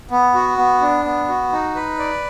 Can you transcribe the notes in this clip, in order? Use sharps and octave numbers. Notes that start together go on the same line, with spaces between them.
B3
F#4
B3
D4
B3
F#4
D#4
B4
D5